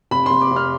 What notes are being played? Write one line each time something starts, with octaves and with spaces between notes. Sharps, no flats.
F1 B5
F1 C6
D6
F1
F6